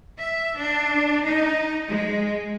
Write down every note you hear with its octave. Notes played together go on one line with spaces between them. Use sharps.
E5
D4
D#4
G#3